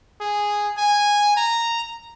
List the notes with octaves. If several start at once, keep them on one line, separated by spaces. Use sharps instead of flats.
G#4
G#5
A#5